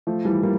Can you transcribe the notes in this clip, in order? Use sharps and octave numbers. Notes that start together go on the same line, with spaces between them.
F3 A3
E3 G3
G3 A#3